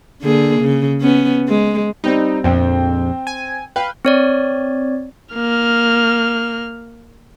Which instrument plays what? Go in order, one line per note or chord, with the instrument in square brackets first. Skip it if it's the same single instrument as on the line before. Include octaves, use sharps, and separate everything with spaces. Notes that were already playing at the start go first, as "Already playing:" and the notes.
[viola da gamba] D3 A#3 G#4
C#3
B3 C#4
G#3
[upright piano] G3 C4 [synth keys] D#4
[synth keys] A#1 F2 [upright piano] C4 G5
[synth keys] G#5
[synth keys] B4 F5 [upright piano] G5
[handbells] C4 C#5 D5
[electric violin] A#3 F6